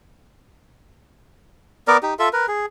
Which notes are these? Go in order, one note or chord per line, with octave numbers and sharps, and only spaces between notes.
B3 A#4 D5
D#4 G4
F4 A4 E5
A#4 B4
G#4